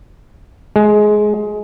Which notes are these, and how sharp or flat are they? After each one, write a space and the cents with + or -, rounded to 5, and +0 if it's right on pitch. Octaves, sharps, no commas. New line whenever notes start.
G#3 +15